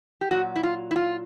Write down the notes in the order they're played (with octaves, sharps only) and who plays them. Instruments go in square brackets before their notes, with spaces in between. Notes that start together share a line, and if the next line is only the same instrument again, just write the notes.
[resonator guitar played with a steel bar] G4
A#2 F#3 F#4
E4
F4
E4
F4